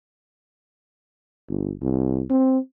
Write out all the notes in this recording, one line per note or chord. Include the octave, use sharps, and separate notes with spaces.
G1
C2
C4